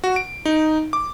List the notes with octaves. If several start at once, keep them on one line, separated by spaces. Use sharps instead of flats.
F#4
D7
D#4
D6